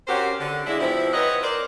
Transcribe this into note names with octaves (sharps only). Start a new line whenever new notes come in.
C4 C#4 F#4 G4 A#4 C5
D3
G#3 D4 E4
B2 F3 C4 E4
C4 B4 C#5 D#5 F#5
A#4 C5 D5